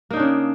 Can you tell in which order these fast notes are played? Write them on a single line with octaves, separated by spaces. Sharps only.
A#3 D#4 D4 C#3